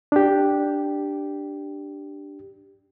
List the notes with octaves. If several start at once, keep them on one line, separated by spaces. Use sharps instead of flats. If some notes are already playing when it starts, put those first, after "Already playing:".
D4 G4